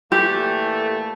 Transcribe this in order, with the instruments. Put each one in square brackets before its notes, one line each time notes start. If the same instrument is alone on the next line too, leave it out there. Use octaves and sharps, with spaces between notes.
[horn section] A#2 E3 A3 [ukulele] G4